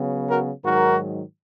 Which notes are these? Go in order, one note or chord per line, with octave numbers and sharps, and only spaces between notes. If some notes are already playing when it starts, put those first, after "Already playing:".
Already playing: C#3 F#3 B3
F#4 A#4
G#2 D#3 F#3 F#4 A#4